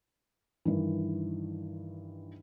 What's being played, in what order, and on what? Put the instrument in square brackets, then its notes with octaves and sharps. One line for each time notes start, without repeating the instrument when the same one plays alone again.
[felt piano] G2 D#3 E3